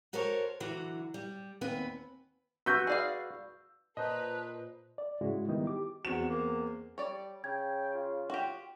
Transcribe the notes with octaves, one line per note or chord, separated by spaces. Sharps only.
F#4 A4 A#4 C5 C#5
D3 E3 F#3 F#4
G3
D#2 B3 C4 B4 G#5
F#4 B4 E6 G6
G#4 D5 F5
A#2 B4 C5 D#5 A5 A#5 F#6
D5
G#2 C#3 G#3 E4 F#4
D#3 G3 B3 D#4 E4
G4 D6
E2 C4 F#4 E7
A#3
G3 C#5 D5
C#3 G5 G#6
F4
F#4 G4